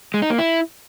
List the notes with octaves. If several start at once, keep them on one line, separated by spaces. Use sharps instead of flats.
G#3
D#4
A#3
E4